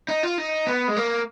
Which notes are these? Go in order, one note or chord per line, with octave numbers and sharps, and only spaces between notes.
D#4
F4
D#4
B3
G#3
A#3